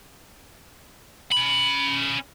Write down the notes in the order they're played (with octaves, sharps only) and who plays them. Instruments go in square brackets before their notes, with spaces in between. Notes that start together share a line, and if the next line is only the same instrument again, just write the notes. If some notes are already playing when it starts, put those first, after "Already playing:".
[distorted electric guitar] C#4 B5